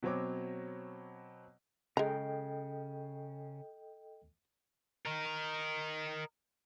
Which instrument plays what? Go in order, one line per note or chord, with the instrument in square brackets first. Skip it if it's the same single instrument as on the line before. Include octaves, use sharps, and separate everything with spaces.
[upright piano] B2 F#3 C4 C#5 D6
[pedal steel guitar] C#3 [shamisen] G#3 A#5 [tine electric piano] A4 D#5 G5
[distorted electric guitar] A#4 D#5